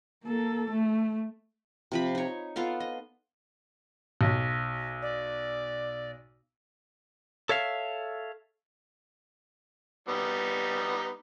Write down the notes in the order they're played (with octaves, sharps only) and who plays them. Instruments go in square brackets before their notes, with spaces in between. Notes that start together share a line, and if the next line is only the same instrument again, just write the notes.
[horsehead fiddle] A#3 A4
A3
[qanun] C3 F3 B5
D#4 C#5
B3 F4 A4 F5
D#5
[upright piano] B1
[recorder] D5
[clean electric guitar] A4 C#5 E5 F5
[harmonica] G3 B3 D#4